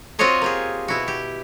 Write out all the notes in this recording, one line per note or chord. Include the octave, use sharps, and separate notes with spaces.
C4 F4 F#4 C5 C#5 D#5
A#3 G4 G#4
B2 E4 F#4
G4